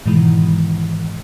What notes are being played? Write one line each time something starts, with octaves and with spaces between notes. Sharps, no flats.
G#2 B2 D#3 E3 G#3